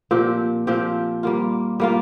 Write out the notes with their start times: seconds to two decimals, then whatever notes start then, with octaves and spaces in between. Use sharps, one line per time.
0.11 A#2 F3 C4 G4
0.67 A#2 F3 C4 G4
1.23 G3 A#3 F4
1.80 G3 A#3 F4